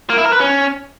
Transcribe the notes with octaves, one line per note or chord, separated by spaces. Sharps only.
A#3
E4
A#4
B4
C#4